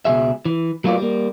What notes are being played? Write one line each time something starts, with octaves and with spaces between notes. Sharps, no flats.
C#2 B2 F3 G#4 E5
E3
F#3 A3 A#3 F4 B4 D5
G3 A#3